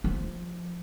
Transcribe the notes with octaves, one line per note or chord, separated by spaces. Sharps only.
F3